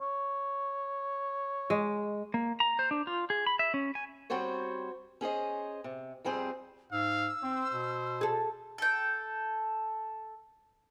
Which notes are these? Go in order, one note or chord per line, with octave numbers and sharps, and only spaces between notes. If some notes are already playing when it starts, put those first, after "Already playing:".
C#5
G#3
A#3
A#5
C5
D4
F4
G#4
B5
E5
C#4
G#5
G3 C4 F#4 C5 C#5
C#4 G#4 C5 D#5
C3
F2 G3 C4 G#4 C5
G#2 F5 E6
C4 C5
B2
G#4 A4
A4 G5